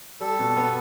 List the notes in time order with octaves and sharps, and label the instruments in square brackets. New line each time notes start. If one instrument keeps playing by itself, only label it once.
[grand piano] G3 [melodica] A4
[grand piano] B2
B3